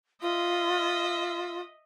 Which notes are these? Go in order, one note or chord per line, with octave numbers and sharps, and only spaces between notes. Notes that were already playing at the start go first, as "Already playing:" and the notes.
F4 D#5 E5